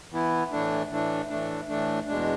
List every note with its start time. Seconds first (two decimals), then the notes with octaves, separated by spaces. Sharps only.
0.12 E3 B3 E4
0.52 A2 E3 A3 D4
0.91 A2 E3 A3 D4
1.29 A2 E3 A3 D4
1.68 A2 E3 A3 D4
2.07 E2 B2 G#3 D4